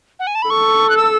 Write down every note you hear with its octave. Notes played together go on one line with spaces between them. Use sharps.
F#5
G#5
A5
B5
A4 C#6
F#6
E6